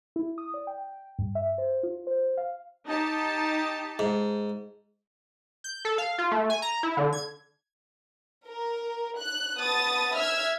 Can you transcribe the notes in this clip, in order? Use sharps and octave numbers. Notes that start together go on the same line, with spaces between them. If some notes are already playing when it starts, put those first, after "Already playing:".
E4
D#6
D5
G5
G2
E5
C5
F4
C5
F5
D#4 G4 A5
G#2
G6
A4
F5
F4
A3
G#5
A#5
E4
D3
G#6
A#4
F#6
B3 A5 D#6 A6
E5 E6 F6 G#6